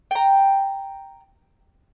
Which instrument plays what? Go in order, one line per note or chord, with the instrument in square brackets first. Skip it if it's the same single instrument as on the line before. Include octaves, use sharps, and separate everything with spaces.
[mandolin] G5 A#5